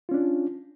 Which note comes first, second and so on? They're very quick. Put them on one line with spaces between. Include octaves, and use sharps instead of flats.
F4 C#4 D4